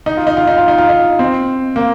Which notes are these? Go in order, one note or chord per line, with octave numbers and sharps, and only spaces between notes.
D#4
F4
D#4
F4
D#4
F4
D#4
F4
D#4
C4
A#3